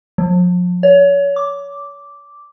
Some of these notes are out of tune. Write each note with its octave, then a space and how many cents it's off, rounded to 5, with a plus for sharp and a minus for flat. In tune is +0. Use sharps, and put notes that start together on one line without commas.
F3 +40
C#5 +30
D6 -5